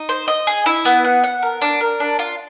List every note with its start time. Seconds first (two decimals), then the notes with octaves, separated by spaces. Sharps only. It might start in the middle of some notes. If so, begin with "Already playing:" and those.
Already playing: D#4
0.09 C5
0.28 D#5
0.47 G#4
0.66 E4
0.85 B3
1.05 F#5
1.24 F#5
1.43 A#4
1.61 D4
1.81 A#4
2.00 D4
2.19 F4